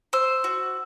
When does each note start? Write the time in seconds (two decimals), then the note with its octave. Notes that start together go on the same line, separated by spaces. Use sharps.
0.13 C5 E6
0.44 F#4